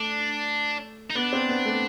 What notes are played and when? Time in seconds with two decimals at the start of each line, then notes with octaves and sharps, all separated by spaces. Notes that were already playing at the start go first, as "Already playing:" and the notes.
Already playing: A3 D4
1.10 D#4
1.15 B3 D4
1.33 C4
1.49 B3
1.65 A3